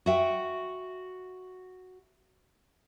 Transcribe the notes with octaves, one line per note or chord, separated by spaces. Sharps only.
F#4 E5 G5